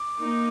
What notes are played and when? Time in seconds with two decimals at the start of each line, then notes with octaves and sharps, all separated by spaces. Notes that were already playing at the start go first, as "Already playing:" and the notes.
Already playing: D6
0.19 A#3 D#4